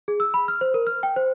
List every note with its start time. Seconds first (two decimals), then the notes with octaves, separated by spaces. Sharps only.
0.08 G#4
0.20 E6
0.34 B5
0.48 F6
0.61 C5
0.74 A#4
0.87 F6
1.03 G5
1.16 C5